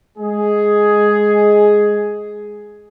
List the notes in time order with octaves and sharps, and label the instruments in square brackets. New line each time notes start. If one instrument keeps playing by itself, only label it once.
[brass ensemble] G#3 G#4